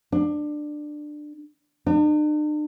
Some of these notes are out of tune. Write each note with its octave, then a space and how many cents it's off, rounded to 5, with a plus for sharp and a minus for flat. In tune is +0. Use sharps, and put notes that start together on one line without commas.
D4 +20
D4 +45